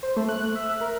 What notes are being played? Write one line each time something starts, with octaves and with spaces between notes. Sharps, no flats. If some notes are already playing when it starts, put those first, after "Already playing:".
C5
A3
F#6
E5
A#4